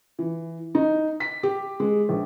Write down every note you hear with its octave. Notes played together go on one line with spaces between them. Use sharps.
E3
D#4
B6
G4
G#3
A#1